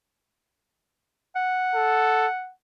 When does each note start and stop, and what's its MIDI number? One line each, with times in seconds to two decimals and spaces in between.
1.36 2.50 78
1.75 2.27 69